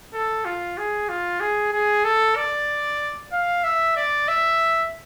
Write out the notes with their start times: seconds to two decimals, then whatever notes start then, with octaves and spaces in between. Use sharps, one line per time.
0.14 A4
0.45 F4
0.77 G#4
1.09 F4
1.40 G#4
1.73 G#4
2.04 A4
2.36 D5
3.32 F5
3.64 E5
3.96 D5
4.28 E5